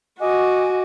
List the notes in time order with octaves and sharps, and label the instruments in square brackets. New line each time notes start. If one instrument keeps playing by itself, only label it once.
[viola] F#4 [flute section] D#5 G#5 D6